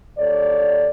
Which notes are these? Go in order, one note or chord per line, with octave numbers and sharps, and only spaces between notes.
D#2 A4 C#5 D5